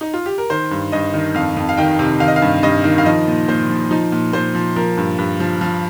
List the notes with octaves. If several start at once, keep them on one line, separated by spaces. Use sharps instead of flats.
D#4
F4
G4
A#4
D#3 C5
G2
G2 D#5
D#3
F2 F5
F2
F5
D#3 G5
C3
D#3 F5
D#5
F5
G2
G2 D#5
D#3
F5
F3 D#5
A#2
A#2 C5
F3
F3 D#4
A#2
A#2 C5
F3
F3 A#4
G2
G2
F3
F3